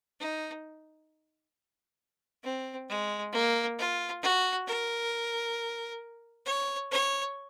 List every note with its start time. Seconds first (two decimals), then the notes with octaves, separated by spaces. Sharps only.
0.20 D#4
2.43 C4
2.89 G#3
3.33 A#3
3.79 F4
4.22 F#4
4.67 A#4
6.46 C#5
6.91 C#5